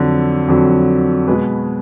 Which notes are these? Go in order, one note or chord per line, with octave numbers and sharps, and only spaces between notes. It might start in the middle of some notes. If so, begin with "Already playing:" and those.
Already playing: F2 D3 F#3
F2 D3 F#3
B2 G#3 B4